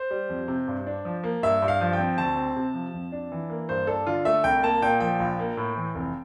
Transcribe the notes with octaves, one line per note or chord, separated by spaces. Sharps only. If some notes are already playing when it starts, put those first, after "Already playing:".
Already playing: C5
G3
F2
C3
G2
D4
F3
A#3
G2 E5
G2
F5
F3
G5
C4
D2 A5
C4
C3
F3
F2
D4
E3
A#3
G2 C5
D4 A4
D3 F4
A3 E5
C2 G5
A#3 A5
A#2 G5
F3 G5
A#1
A#3
A2
E3
F1